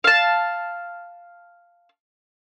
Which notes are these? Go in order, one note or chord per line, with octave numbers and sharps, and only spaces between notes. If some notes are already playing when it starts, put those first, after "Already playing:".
F5 A5